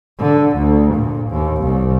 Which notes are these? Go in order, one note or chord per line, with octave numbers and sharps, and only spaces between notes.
D3
D2
A#2
D#2
C2